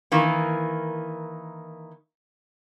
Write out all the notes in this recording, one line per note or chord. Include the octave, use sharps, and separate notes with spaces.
D#3 E3 A#3